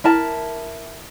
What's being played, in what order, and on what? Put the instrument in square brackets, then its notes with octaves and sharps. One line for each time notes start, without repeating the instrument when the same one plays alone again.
[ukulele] E4 A#4 A5